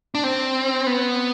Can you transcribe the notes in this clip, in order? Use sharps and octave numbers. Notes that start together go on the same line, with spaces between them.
D4
C4
B3